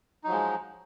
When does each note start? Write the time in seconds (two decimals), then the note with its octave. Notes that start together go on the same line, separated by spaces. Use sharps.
0.24 D#4
0.27 F#3
0.29 F3
0.32 G#3